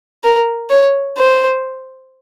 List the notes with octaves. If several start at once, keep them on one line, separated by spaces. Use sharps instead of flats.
A#4
C#5
C5